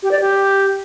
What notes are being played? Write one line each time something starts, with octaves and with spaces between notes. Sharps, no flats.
G4
D5
G4